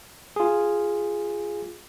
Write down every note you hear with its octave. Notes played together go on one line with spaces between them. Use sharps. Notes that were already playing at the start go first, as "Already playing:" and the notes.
F4 G#4